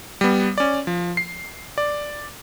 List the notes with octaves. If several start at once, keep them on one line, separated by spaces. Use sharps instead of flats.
G3 B3
C#4 D5
F3
C7
D5